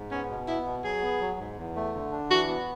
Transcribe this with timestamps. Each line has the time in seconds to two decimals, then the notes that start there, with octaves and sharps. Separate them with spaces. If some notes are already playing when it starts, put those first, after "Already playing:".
Already playing: G#2
0.11 B3 C#4
0.30 B2
0.47 B3 E4
0.65 B2
0.84 F#3 G#4
1.02 B3
1.21 F#3
1.39 G#2
1.57 E2
1.76 A3
1.94 D3
2.12 D4
2.30 E3 F#4
2.49 B3